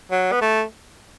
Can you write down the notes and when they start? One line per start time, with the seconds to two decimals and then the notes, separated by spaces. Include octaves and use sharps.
0.11 F#3
0.32 B3
0.41 A3